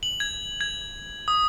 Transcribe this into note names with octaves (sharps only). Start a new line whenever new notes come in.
F#7
G#6
G#6
D#6